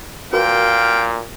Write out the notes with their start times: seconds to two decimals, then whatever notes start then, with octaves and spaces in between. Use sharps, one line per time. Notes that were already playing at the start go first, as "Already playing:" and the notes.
0.33 A#2 F#4 A#4 B4 F5 G5